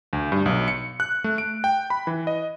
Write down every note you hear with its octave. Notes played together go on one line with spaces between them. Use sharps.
D2
G2
B1
C#7
F#6
A3
D7
G5
B5
E3
D#5